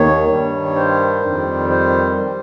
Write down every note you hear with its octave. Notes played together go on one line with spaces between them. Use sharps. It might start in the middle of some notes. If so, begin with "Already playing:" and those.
Already playing: D#2 D#3 C#5
G2 D#3 G3
C5
F2 D#3 G3
C5
G3